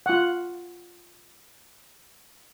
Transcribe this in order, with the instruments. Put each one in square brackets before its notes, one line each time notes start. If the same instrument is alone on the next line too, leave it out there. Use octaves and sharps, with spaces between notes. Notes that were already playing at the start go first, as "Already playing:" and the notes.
[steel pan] F4 F#5